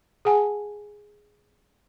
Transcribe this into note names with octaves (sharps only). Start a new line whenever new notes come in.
G#4 F#5 G#5 A5